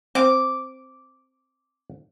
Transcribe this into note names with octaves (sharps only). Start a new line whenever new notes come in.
C4 F5 D6